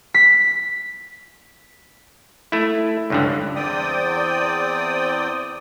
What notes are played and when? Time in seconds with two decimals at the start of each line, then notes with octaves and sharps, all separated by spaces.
0.14 B6
2.52 A3 E4
3.10 C#2 G2 D3
3.56 E2 C4 D5 G5 D#6